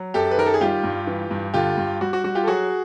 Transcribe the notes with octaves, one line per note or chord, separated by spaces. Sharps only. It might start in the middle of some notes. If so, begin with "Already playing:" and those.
Already playing: F#3
F#2 G4 A4
B4
D#3 A#4
A4
G#4
G3 F4 G4
G2
E3
G2
D3 F4 G4
G2
G3 F#4
F#4
G3 F#4
F4 G4
A4
F#3 F#4 G#4